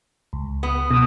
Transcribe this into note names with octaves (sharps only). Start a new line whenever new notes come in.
C#2
B3
B2 D#6